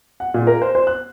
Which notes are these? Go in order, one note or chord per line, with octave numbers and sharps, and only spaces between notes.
F#5
A#2
A#4
C5
C5
F#6